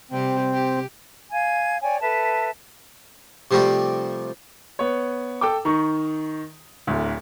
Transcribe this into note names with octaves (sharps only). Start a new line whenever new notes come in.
C3 G3 C4 G4
G4
F5 G#5 G#6
C#5 D5 G5 G#5
A4 B4 E5 A5
C3 F3 G3 A3 G4
B3 C#5
A4 G5 D6
D#3 D#4 C#6
D1 D2